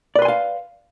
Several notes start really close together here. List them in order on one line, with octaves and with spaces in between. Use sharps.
D5 B4 C6 G#5 F5